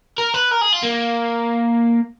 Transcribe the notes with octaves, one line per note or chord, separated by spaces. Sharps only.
A#4
B4
A#4
G#4
F4
A#3